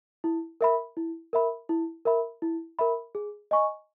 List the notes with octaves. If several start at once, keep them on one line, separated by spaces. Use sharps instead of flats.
E4
A#4 E5 B5
E4
A#4 E5 B5
E4
A#4 E5 B5
E4
A#4 E5 B5
G#4
D#5 G#5 C#6